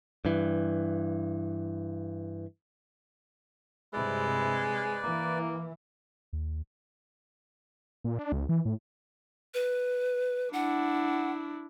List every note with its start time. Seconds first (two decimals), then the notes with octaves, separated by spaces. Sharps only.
0.25 G2 E3
3.93 G2 C3 G#3 E4 B4 D5
5.03 E3 A#3
6.33 D#2
8.04 A#2
8.19 D4
8.32 C#2
8.49 E3
8.65 A2
9.54 B4
10.53 D4 E4 F#5